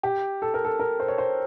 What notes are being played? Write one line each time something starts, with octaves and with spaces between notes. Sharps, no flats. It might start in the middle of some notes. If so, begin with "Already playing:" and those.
G4
A4
A#4
A4
A#4
C5
C#5
C5